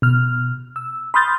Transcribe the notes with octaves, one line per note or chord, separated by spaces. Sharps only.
B2 F6
E6
B5 C6 D#6 F6 G6 A6